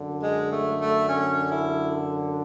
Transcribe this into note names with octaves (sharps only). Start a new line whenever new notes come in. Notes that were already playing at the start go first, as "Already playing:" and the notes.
Already playing: F#2 D3
G#3
A3
A3
C#4
E4